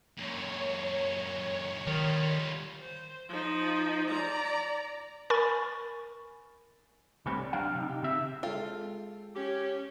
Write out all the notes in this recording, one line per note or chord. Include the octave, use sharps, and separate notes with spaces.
F#2 A#2 C#5
D#3 G3 F4
C5
F3 D#4
D5 A#5
A#4 G#5 B5 C#6 A6
C2 A3 C4 C#4 G4 B4
G3
F#3 D4 F5 G5
C3 D#4
G4
C#3 C4 E5
G#3 F4 A4 G5
C#4 G4